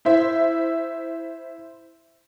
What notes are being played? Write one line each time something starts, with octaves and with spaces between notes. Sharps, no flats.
E4 C5 E5